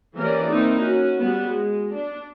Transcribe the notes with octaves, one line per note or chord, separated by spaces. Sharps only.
E3 A#3 C#4 G4 A#4 D5
A#3 C4 D#4 E4
C#4 F#4
G3 B3 F#4
G#3
D4